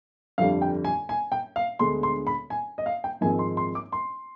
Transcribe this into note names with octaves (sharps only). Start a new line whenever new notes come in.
G1 F2 D3 G3 F5
G5
G#5
G#5
G5
F5
D2 D3 G#3 B3 C6
C6
B5
G#5
D#5
F5
G5
G#1 G#2 F3 G#3 C4 G#5
C6
C6
D6
C6